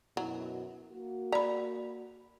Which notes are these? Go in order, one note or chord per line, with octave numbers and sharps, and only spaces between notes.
F#2 B2 F#3 E4
A#3 F#4
D5 A#5 B5